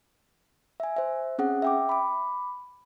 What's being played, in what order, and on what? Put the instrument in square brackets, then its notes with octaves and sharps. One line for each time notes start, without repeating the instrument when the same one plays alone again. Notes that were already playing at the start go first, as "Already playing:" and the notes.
[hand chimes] E5 G#5
C5 E5
C4 C#4 G#4 F#5
E5 G5 D6
B5 D6